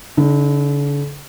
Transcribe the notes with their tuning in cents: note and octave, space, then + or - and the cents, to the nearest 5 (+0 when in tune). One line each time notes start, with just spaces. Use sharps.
D3 -45 D#4 +0